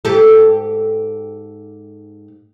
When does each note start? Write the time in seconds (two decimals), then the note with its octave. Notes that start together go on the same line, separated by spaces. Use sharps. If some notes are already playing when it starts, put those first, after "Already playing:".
0.05 G#2 G4 A4